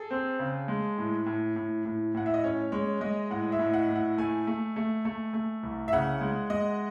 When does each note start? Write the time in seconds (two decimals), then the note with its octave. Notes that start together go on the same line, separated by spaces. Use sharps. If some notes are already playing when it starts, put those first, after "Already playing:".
Already playing: G#4 A4
0.11 C4
0.39 C#3
0.68 G#3
0.98 A2
1.26 A2
1.56 A2
1.85 A2
2.14 A2 F#5
2.26 E5
2.34 D#5
2.44 C#4 C#5
2.72 G#3 C#5
3.01 G#3 D#5
3.30 A2 F#5
3.52 E5
3.59 A2
3.74 F#5
3.89 A2
3.95 F#5
4.18 A3 G#5
4.47 A3
4.76 A3
5.05 A3
5.34 A3
5.63 C2
5.88 E5
5.93 C#3 F#5
6.21 G#3
6.50 G#3 D#5